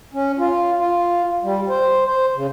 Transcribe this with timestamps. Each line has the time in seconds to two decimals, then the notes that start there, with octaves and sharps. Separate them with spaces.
0.14 C#4
0.38 F4
0.78 F4
1.43 G3
1.69 C5
2.05 C5
2.35 C#3